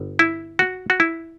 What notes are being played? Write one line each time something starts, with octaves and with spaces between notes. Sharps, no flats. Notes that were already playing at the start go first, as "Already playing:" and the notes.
Already playing: G1
E4
F#4
F#4
E4